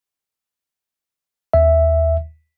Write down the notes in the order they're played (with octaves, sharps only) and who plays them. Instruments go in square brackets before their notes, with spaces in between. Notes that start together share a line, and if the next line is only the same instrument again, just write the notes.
[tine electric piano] D#2 E5